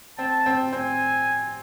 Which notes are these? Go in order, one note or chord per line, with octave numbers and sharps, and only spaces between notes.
C4 A5
C4
C4 G#5